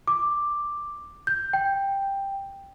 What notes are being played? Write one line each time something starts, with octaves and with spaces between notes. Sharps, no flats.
D6
G6
G5